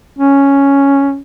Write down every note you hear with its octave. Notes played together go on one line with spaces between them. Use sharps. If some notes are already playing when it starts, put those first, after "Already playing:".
C#4